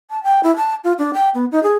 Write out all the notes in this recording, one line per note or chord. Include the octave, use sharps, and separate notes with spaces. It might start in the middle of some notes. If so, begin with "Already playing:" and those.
A5
G5
E4
A5
F4
D4
G5
B3
D#4
G#4